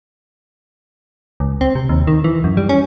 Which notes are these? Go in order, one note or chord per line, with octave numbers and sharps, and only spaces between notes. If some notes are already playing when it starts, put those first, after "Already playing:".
C#2
C4
C3
D#2
D#3
E3
F#2
G3
C#4